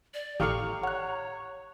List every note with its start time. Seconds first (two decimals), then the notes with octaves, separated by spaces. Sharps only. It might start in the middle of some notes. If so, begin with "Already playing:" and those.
0.14 D5
0.40 G#1 A2 G4 A4 F5 A#5 C#6
0.83 C#5 F#5 F#6